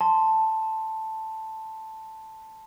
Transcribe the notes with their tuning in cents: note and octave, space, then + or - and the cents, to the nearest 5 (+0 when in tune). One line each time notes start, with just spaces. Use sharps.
A5 +0 C6 +0